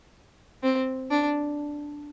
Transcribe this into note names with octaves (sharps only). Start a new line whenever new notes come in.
C4
D4